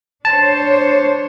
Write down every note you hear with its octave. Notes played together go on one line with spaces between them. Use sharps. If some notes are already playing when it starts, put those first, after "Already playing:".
D4 C5 C#5 A5